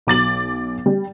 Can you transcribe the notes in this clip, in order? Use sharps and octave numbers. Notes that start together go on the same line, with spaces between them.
B1 D6 A6 F#7
G3